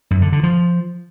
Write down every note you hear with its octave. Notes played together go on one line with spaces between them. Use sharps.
F#2
D3
D3
F3